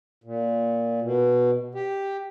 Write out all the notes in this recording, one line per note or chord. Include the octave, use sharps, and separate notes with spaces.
A#2
B2
G4